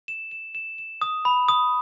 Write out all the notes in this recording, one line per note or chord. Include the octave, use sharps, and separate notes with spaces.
E7
E7
E7
E7
D#6
B5
D#6